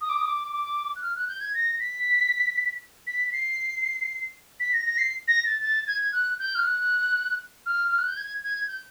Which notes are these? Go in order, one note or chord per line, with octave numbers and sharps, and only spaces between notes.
D#6
D6
D#6
D6
D6
F#6
F6
F#6
G6
G#6
A#6
B6
B6
B6
C7
B6
A#6
A#6
C7
A#6
A6
A6
G#6
F#6
G6
F6
F#6
F6
F6
F#6
G6
G#6
G#6
G6